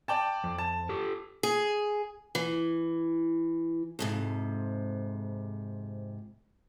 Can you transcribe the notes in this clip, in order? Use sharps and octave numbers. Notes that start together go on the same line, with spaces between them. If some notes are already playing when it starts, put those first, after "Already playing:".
D5 G5 A5
F2
A5
G4 A4
G#4
E3
F2 G#2 C3